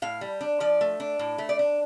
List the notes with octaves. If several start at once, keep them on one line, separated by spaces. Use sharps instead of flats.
A2 F5
G3
D4
F3 D5
A3
D4
A2
A3
D5
D4